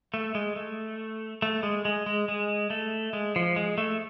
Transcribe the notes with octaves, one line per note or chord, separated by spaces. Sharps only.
A3
G#3
A3
A3
G#3
G#3
G#3
G#3
A3
G#3
F3
G#3
A3